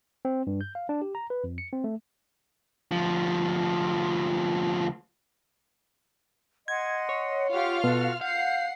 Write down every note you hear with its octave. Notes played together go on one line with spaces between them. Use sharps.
C4
G2
G6
F5
D4
G4
A#5
B4
F2
C#7
C4
A3
D2 F3
D#5 F#5 C6 G#6
C#5
F4 G4 F5 F#5 C#6 F6
B2 F#4 A4
F5 F#5 G6 C7